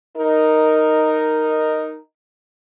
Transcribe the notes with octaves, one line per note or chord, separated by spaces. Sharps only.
D#4 A#4